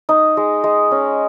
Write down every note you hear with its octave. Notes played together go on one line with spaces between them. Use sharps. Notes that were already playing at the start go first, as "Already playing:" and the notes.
D#4
G#3
G#3
C#4